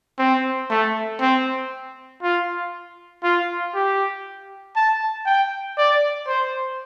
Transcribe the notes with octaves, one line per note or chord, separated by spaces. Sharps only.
C4
A3
C4
F4
F4
G4
A5
G5
D5
C5